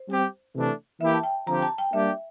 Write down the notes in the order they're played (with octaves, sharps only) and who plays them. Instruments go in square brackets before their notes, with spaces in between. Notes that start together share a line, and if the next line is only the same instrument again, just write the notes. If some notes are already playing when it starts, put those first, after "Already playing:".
Already playing: [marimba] C5
[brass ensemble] G3 C4 G4
C3 E3 A3 D4
[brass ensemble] E3 A#3 E4 G4 [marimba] E5
[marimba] A5
G5
[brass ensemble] D3 F3 C4 G4 [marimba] A#5
[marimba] A5
G5
[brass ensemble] G3 A#3 D4 G4 [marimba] E5